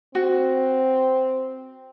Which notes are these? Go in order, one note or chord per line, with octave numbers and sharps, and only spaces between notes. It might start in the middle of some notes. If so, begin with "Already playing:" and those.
C4 F#4